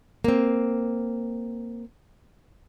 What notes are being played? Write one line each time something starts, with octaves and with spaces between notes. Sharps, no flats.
A#3 C4